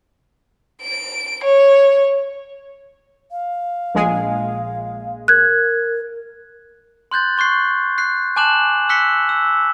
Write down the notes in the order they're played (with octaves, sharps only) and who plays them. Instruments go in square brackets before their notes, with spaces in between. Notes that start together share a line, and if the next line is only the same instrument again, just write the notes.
[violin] D7
C#5
[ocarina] F5
[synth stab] A#1 G#3 G#4
[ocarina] A#4 [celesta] F#6 G#6
[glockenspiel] C6 F#6 G6 A6
C6 C#6 F#6 C7
F#6 C7
G#5 A5 D6 F#6 E7 F#7
E6 F#6 B6 C#7 G7
E6